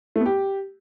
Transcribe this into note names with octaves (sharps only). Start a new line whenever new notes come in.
A3
B3
G4